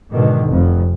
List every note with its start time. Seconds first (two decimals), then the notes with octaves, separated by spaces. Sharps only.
0.14 G#2 B2 D3 D#3
0.48 F1 F2